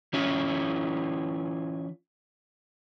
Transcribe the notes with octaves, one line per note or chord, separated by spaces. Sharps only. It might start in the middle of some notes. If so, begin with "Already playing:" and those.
E3 C#4 E4 F4